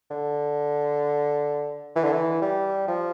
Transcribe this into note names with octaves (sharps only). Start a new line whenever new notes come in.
D3
E3
D3
E3
G3
F3